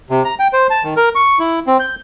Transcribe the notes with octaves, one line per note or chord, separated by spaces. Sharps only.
C3
A#5
G5
C5
A5
D#3
A#4
C#6
E4
C4
G6